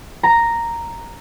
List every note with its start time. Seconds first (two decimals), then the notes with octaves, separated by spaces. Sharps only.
0.23 A#5